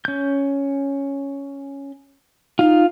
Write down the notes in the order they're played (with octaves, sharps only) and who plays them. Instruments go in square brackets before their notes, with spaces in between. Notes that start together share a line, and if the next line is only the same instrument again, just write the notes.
[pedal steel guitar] C#4 G6
[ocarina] D#4 [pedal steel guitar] F4 F5